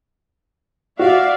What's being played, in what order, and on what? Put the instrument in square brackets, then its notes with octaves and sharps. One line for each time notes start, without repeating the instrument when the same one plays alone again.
[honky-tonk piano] F#4 [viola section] D5 E5 F5